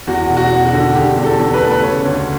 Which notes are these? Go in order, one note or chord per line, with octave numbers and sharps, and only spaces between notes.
E2 F#4
E1
F#4
E1
F#4
D3
D3 G4
E2
A4
E2
B4
A3 A4
B4
C#3 C#5
D2